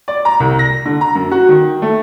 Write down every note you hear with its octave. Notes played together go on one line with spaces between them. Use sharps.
D5
A#5
C2
A#6
D3
A#5
F#2
F#4
D#3
A3